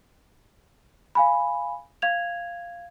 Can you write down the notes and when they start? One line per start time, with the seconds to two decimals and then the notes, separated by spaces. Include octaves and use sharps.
1.15 F5 G#5 B5
2.02 F5 G#6 F7